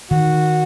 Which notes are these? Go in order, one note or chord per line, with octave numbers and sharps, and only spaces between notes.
D#3 F#4